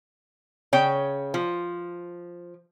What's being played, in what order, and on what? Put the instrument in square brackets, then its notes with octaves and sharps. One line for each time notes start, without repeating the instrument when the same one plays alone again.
[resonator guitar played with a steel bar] C#3 C#5 G5
F3